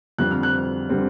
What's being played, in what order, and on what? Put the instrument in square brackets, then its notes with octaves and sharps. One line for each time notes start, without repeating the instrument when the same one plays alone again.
[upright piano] F2 D3 G3 C4 F#6
F6
F#6
D3 G3 C4